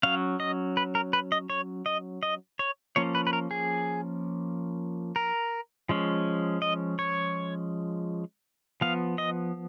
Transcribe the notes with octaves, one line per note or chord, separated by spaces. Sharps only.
F#3 C#4 F5
D#5
B4
A#4
B4
D#5
C#5
D#5
D#5
C#5
F3 A#3 C#4 C#5
B4
B4
A#4
G#4
A#4
F3 G#3 C#4
D#5
C#5
F3 B3 F5
D#5